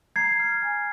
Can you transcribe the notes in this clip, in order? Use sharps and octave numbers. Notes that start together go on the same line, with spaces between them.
A#5 G#6 C7
F6
G#5